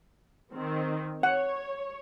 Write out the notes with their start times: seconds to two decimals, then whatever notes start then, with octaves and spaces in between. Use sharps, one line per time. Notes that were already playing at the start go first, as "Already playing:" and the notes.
0.54 D#3 C4
1.23 C#5 F#5